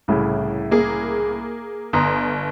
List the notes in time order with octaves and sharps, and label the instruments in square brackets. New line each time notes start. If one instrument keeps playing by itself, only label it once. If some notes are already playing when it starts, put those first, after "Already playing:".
[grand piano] C2 A2 C#3
[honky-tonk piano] A#3 G#4
[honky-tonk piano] G1 [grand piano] A#5 C6 D#6